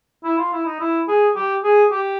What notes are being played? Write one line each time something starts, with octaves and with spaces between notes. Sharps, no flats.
E4
F4
E4
D#4
E4
G#4
G4
G#4
G4